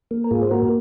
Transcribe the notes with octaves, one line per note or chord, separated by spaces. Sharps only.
A#3
A#4
G#2 F4 G#4
C5
A#3 F#4 A#4